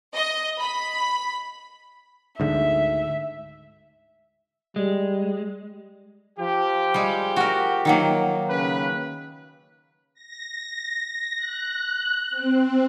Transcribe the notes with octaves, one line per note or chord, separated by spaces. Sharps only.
D#5
B5
D2 G#2 D3 E5
G3 G#3
F3 G4
G3 G#3
F#4 A#4
D#3 F#3 A#3
C#3 C#4 B4
A#6
F#6
C4